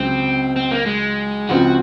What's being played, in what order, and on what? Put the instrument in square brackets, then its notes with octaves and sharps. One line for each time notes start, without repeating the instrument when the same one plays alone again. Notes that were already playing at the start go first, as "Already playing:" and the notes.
Already playing: [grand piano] C#2 C#3 F#3 [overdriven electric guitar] C4
[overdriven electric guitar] C4
A#3
G#3
[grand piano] C#2 C#3 F3 C4 [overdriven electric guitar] F#4